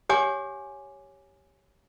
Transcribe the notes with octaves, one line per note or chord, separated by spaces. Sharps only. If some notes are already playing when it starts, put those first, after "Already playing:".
G4 C#5 F#5 G#5 D6